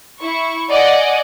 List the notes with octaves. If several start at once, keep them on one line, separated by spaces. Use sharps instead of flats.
E4 C#6
D5 D#5 F#5 G#5